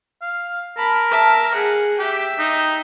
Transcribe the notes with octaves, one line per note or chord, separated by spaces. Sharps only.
F5
A#4 A5 B5
E5 A5
G#4 F#5
G4 E5 G5
D#4